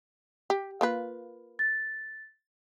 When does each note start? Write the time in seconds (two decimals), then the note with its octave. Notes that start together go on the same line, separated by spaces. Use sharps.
0.50 G4
0.81 A#3 F4 B4
1.59 A6